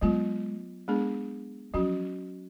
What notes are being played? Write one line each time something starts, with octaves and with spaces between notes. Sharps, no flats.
F#3 G#3 B3 F4
G#3 B3 D4 G#4
F3 F#3 C#4 F#4